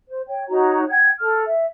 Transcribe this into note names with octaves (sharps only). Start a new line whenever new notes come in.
C5
C#5 G5
D#4 F#4 C#5 A#5
F#5 G5 G#6
A4 F6
E5